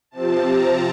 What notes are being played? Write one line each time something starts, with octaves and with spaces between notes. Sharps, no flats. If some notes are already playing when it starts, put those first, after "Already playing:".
C3 F3 C4 A5
A#5